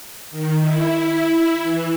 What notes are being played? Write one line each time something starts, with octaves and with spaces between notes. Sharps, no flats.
D#3
E4
E4
E3